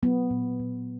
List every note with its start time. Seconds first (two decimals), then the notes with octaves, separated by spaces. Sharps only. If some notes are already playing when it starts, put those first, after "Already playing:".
0.03 F#3 B3
0.30 A#2
0.60 A#2